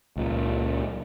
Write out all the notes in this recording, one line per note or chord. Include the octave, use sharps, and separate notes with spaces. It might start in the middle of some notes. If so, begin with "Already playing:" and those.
C#2 A#2